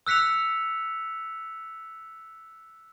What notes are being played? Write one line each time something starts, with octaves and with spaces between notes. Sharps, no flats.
E6 F#6 B6 C#7 F7